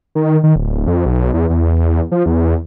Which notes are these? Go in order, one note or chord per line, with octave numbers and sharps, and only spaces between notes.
D#3
D#3
D1
F2
B1
E2
E2
F3
E2